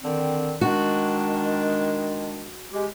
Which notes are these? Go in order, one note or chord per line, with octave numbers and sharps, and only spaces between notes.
D3 D#3 C4
D#3 G#3 D4 F#4
G#3 G4